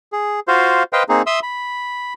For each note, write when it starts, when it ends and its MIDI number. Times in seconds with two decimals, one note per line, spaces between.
0.13 0.40 68
0.48 0.83 65
0.48 0.83 66
0.48 0.83 72
0.48 0.83 77
0.93 1.03 71
0.93 1.03 72
0.93 1.03 75
0.93 1.03 77
0.93 1.03 79
1.09 1.22 58
1.09 1.22 60
1.09 1.22 63
1.09 1.22 68
1.26 1.40 76
1.26 1.40 84
1.26 1.40 87
1.26 1.40 88
1.43 2.14 83